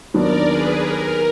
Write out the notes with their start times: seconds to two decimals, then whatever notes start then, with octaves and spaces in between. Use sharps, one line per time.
0.14 D#2 D#3 F#3 B3 D4 A#4 D5
0.46 G#4 B4
0.77 A#4